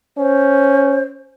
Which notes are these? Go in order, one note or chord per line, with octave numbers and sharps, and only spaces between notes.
C#4 C5